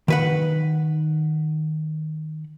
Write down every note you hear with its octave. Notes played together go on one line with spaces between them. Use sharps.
D#3 B4 F#5